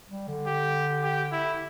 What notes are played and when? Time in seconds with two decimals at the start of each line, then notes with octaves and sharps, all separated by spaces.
0.09 G3
0.28 D3
0.47 G4
1.03 G4
1.32 E4